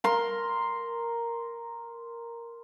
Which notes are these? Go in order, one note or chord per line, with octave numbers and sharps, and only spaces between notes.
A#4 C6